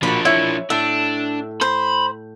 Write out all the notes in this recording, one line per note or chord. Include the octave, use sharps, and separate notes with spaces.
F3 A#3 D4 F#4 B5
E4 C#5 E5
A2 D4 E5
C5 B5